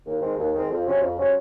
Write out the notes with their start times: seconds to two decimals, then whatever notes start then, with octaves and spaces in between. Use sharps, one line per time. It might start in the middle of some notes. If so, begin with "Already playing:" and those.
0.05 D#2
0.21 D#3 G#3 C4
0.37 D#2
0.53 D#3 G#3 C4
0.69 F2
0.85 C3 F#3 C#4
1.02 F2
1.17 C3 F#3 C#4